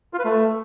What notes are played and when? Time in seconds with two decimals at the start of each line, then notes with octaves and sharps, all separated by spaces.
0.14 F4
0.19 B4
0.25 A3